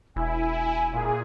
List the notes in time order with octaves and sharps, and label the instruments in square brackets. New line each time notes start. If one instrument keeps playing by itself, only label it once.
[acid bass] E1 [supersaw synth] E4 [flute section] G#5
[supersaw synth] A#2 G#4